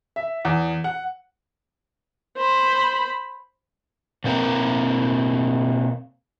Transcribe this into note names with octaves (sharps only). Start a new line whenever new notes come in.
E5
E2
F#5
C5 B5
B2 A#3 C4 A#4